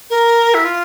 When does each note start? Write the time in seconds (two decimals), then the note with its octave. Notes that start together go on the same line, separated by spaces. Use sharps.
0.10 A#4
0.54 E4
0.65 F4